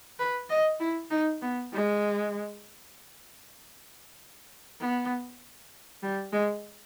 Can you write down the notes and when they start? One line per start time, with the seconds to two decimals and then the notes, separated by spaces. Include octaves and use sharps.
0.19 B4
0.50 D#5
0.80 E4
1.11 D#4
1.42 B3
1.73 G#3
4.80 B3
6.03 G3
6.33 G#3